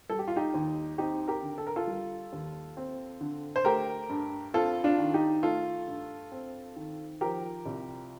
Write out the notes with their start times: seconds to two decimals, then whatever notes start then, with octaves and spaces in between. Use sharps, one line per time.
0.10 G3 A4
0.19 G4
0.28 F4
0.36 D#4 G4
0.54 D#2
0.98 C4 D#4 G4
1.28 G4 A#4
1.43 D3
1.58 A4
1.67 A#4
1.76 F4 A4
1.87 G3
2.32 D#2
2.77 C4
3.21 D3
3.56 C5
3.65 A3 G4 A#4
4.09 G2
4.54 C4 F4 A4
4.84 D4 F4
4.98 D#3
5.14 D#4 G4
5.43 A3 F4 A4
5.87 G2
6.32 C4
6.76 D#3
7.21 F3 G4 A#4
7.66 C2